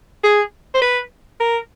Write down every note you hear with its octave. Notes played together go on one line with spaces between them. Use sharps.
G#4
C5
B4
A#4